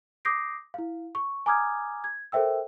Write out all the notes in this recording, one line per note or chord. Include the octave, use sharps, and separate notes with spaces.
D6 D#6 G6 A#6 C7 D7
E4 F5
C#6
G#5 A#5 D6 D#6 F6 G#6
G#6
A4 A#4 C5 E5 G5 E6